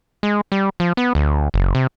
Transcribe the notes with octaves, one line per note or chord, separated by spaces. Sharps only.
G#3
G3
F3
B3
D2
F#1
C3